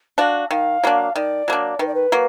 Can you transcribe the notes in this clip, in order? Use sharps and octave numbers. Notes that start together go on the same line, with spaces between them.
D4 F#4 F5
D#3 F5
F#3 A#3 D4
D#3 D5
F#3 A#3 D4
D#3 B4
D5
B4
F#3 A#3